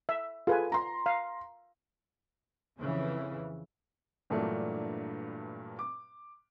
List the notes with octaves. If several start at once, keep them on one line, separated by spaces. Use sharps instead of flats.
E5
F4 G#4 A4 B4 G#5
A#5 C6
F5
F2 C#3 E3
G2 A#2 E3 F#3 A3 D4
D6